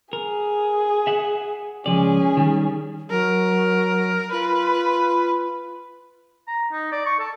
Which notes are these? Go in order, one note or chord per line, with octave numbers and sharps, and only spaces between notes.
G#4 A#4
E5 F#5
C#2 F3 C#4 G#4 D5
D#3 G3
F#3 A#4
F4 B4
A#5
D#4
D5
C#6
A4